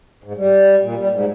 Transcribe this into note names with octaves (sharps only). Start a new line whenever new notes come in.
G#2
G3
A#2
G3
G#2